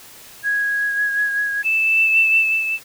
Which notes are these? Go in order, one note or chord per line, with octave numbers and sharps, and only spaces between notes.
G#6
E7